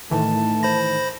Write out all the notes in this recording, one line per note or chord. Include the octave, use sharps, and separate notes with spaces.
A2 D#3 E3 A3 A5
C5 B5 A#6